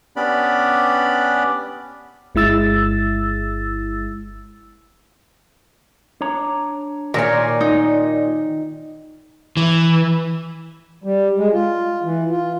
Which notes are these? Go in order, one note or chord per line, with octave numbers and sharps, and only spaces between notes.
B3 C#4 D4 G4 D5 B5
G1 G#3 E4 E6 A6
D4 C#5 A#5
A#2 D#3 A#4 C#5 D5 G#5
D#4
E3
G3
G#3
F4
E3
F4